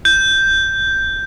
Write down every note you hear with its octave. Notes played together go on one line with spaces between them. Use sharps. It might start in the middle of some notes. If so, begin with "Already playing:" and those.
G6